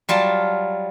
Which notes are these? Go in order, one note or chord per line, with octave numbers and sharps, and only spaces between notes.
F#3 G3 F4 A5